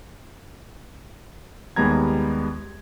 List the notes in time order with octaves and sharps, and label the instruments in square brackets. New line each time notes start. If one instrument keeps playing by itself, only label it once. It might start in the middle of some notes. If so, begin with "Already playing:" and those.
[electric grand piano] D#2 G3 G#3 B3 A#5 G#6